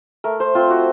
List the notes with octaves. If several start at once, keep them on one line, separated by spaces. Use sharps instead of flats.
A3 A#4
C5
C4 F4
F#4